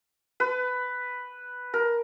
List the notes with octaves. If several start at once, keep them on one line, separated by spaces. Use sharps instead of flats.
B4
A#4